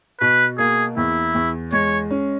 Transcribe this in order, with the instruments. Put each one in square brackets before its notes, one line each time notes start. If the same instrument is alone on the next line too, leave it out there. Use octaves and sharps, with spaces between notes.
[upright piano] B2 [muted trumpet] B4
[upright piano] A#3 [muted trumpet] G#4
[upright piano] E2 [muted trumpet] E4
[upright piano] E2
[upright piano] G#3 [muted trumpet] C#5
[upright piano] C#4